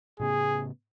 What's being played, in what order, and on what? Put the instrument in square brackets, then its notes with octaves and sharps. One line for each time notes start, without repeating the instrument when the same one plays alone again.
[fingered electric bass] A2 C#3 B3 [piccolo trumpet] G#4